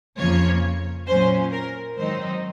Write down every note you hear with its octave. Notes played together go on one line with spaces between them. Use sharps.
F2 C#3 F3 A#3 C#5
A#2 F#3 C#4 C5
A#4
G#2 D#3 F#3 C4 D#4 C5